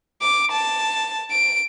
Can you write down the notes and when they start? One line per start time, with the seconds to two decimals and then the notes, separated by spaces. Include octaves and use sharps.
0.22 D6
0.52 A5
1.31 D7